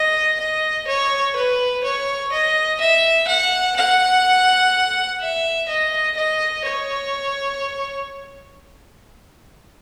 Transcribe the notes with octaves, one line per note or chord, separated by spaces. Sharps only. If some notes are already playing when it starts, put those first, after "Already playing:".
Already playing: D#5
D#5
C#5
B4
C#5
D#5
E5
F#5
F#5
E5
D#5
D#5
C#5